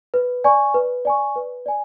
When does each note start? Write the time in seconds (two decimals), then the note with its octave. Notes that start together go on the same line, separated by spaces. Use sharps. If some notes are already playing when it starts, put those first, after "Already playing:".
0.14 B4
0.44 D5 G#5 C#6
0.74 B4
1.05 D5 G#5 C#6
1.36 B4
1.66 D5 G#5